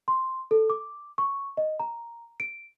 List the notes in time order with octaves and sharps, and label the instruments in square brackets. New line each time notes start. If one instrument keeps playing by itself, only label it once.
[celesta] C6
A4
D6
C#6
D#5
A#5
D7